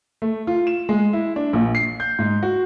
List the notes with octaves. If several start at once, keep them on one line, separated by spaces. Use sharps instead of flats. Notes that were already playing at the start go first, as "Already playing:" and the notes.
A3
F4
E7
G#3
E4
D4
A#1
C7
G6
G#2
F#4